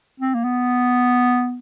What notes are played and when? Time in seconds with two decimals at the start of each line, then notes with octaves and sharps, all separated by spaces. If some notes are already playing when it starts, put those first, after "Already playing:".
0.20 C4
0.34 A#3
0.44 B3